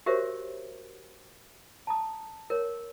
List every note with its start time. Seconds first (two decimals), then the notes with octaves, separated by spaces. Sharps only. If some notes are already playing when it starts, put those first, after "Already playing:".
0.06 F#4 G4 A#4 C5 C#5 E5
1.87 A5 A#5 D#6
2.50 A#4 C#5